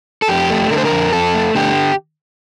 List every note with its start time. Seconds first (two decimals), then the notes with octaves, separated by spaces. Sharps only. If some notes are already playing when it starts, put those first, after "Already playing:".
0.22 A4
0.28 F2 G4
0.50 A3
0.70 D3 A#4
0.78 C5
0.85 A#4
0.92 F2
1.13 F2 A4
1.35 A3
1.55 D3 G4